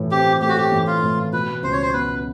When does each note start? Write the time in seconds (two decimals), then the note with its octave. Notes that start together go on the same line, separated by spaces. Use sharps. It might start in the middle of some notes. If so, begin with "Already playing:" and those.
Already playing: A2 E3
0.11 C4 G4
0.41 A3 G4
0.49 F#4
0.58 G4
0.72 E3
0.87 F4
1.03 A2
1.33 B2 B4
1.63 C#2 C5
1.72 C#5
1.83 C5
1.93 B3 B4